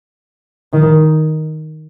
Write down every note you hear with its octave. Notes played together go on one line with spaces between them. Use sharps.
D#3